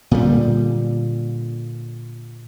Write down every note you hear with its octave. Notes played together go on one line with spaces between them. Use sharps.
A#2 D3 G3